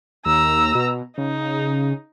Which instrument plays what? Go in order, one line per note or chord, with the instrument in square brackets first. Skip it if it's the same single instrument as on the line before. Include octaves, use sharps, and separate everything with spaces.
[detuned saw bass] D#2 [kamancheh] A#5 E6
[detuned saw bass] B2
[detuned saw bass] C#3 [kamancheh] D#4